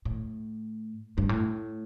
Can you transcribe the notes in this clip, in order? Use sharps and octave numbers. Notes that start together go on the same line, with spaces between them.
A2
G2
A2